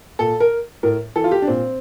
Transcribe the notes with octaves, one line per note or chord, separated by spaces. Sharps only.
A#2 A4
A#4
A2 A#4
E3 A4
F4
G4
D4
A#2 C4